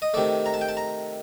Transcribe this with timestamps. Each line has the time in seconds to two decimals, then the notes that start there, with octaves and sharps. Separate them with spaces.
0.02 D#5
0.14 C3 D#3 A3 D5
0.46 A#5
0.54 A5
0.61 G5
0.69 A5
0.77 A#5